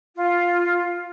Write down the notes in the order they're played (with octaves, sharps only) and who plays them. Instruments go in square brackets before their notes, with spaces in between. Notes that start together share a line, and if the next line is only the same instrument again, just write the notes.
[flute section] F4